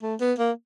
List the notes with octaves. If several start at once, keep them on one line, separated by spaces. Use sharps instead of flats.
A3
B3
A#3